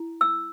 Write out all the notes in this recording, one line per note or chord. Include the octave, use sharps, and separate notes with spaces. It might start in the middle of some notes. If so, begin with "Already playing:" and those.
Already playing: E4
E6